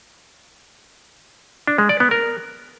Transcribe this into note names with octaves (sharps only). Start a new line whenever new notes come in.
D4
G#3
D5
B3
A#4